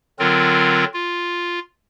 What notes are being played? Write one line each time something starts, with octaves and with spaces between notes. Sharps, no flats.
D3 F#3 C4 F4 A#4
F4